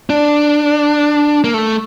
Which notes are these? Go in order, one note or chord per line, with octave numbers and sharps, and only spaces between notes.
D4
A#3
A3